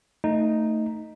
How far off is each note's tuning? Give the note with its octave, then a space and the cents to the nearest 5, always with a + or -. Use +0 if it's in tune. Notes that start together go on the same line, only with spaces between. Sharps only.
A3 +20 D#4 +0